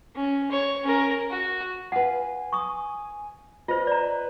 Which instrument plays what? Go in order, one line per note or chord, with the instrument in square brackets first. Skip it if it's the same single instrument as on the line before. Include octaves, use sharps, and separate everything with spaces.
[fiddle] C#4
C#5
C#4 A#4
F#4
[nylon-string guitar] F4 B4 [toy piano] F#5 [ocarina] G#5
[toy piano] C#6 D#6
[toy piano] F4 C5 [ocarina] B4 [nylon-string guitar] D#5
[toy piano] D5 A#5